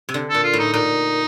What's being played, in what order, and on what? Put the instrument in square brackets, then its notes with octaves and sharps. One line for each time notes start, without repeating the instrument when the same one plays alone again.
[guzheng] C3
D3
[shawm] A4
[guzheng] A#2
[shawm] F4
[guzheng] A2
[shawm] D#4
[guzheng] A#2 [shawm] D#4